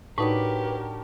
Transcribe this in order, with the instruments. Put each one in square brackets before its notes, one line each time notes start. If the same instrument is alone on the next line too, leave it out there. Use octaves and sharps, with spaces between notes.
[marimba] A2 D#4 [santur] D4 F#4 C#5 [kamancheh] G4 A#4 [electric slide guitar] B4